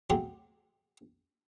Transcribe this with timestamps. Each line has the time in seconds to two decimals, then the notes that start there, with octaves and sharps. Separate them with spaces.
0.10 C3 F#3 A3 G4 G#4 C6